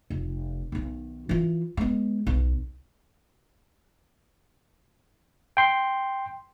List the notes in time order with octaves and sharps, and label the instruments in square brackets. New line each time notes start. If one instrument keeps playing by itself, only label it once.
[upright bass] F1
B1 D#3
E3 F4
G#3 B3
B1
[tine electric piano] G5 C6